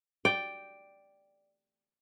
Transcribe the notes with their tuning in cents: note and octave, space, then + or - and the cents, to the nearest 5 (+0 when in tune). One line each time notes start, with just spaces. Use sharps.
D5 +0 G5 +0